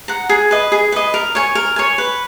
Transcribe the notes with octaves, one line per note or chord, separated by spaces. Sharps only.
F#5 A#5
G#4
B4 D#5
G#4
B4 D#5
A#4
C#5 G#5
A#4
C#5 G#5
B4